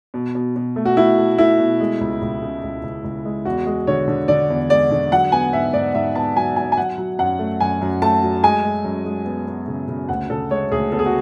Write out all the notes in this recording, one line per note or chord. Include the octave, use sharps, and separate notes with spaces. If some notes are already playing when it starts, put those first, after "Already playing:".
B2
B2
B2
A3
F#4
A3 E4
A3
A3 E4
B2
G#3
C#2
C#2
C#3
C#2
C#2
C#2
G#3
E2 F#4
G#3
D3 C#5
D3
D3 D5
E2
G#3 D5
D3
F#3 F#5
B3 G#5
G#2 E5
G#2 D5
G#2 E5
B3 A5
F#3 G#5
F#3 G#5
G#5
F#3 F#5
F#3
F#2 F#5
A3
F#2 G#5
F#2
A3 A5
F#3
G#3 G#5
G#3
F#2
G#3
B3
B3
C#3
C#3
D2 F#5
C#3 A4
G#3 C#5
D2 G#4
B3 A4
G#4
F#4